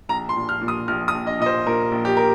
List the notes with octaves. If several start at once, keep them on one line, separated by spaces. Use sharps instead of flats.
A#1 A#5
C6
A#2
F6
A#2
D#6
A#1 F6
D#6
A#1
D#5
A#2 D#5
C5
A#2 A#4
A#1
G4
A#4